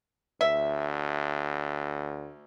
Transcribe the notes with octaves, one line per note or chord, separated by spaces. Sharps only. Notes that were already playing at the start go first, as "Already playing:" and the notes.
D2 E5